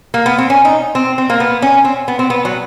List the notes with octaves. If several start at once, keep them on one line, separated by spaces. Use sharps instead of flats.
A#3
B3
C4
C#4
D#4
C4
C4
A#3
B3
C#4
C4
B3
C4
B3
F#3